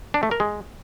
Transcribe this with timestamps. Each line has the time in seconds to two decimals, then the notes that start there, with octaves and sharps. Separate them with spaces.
0.14 D4
0.23 A3
0.31 A#4
0.40 G#3